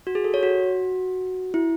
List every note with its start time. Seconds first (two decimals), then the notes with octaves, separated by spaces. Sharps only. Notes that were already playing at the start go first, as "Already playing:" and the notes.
0.07 F#4
0.15 G#4
0.24 A4
0.34 C#5
0.43 F#4
1.54 E4